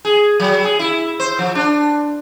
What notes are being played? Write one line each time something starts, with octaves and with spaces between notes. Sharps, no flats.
G#4
F#3
G#4
E4
C5
F3
D4